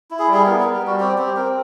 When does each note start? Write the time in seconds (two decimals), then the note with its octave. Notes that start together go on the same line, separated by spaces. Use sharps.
0.11 E4
0.19 G#4
0.28 G3
0.34 G#4
0.46 B3 A#4
0.60 G3 A#4
0.73 A#4
0.82 G3 F#4
1.00 C4 G4
1.18 C4 G4
1.36 C4 A#4